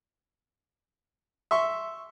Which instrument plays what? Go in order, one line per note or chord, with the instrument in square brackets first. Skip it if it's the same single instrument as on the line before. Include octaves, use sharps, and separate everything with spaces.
[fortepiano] E5 C6 C#6